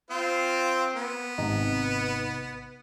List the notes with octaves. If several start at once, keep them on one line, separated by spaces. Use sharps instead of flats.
C4 F4 C5
B3
G#1 C3 D#4